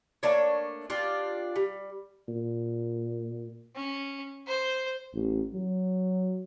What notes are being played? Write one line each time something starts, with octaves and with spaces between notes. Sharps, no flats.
A3 A#3 D4 C#5
D4 F4 G4
G3
A#2
C#4
C5
A1
F#3